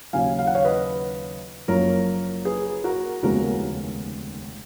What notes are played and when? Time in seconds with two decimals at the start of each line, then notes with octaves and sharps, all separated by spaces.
0.13 D#2 C#3 F#3 F5 G#5
0.39 F5
0.47 F#5
0.55 C#5 F5
0.65 B4 D#5
1.68 F#1 F#2 F3 A#3 A#4 C#5
2.45 G#4 B4
2.84 F#4 A#4
3.23 F1 D#2 C#3 G#3 B3 F#4 A#4